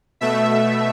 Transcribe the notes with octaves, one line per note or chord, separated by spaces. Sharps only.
B2 A3 E5